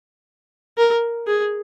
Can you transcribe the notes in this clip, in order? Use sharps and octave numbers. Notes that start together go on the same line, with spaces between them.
A#4
G#4